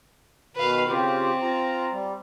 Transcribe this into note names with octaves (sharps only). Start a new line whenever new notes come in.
B2 D#3 B4 F5
C#3 C4 F4 G4
F4 A#5
G3